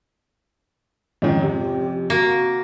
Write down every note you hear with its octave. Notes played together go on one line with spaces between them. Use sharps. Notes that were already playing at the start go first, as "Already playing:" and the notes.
F2 G#2 D#3 C#4
C3 G4
A#3 F#4